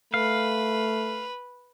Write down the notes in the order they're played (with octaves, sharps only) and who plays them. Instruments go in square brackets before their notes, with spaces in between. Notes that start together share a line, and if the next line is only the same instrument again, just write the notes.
[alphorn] A3 [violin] B4 [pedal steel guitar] F5